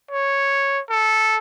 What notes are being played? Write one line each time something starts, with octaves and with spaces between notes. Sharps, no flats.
C#5
A4